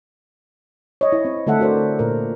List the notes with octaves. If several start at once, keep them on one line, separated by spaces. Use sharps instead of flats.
C#5 D#5
E4
C4
D3 A3 A4 E5 F#5
F#4 A#4 C5 D5
A#2 A#4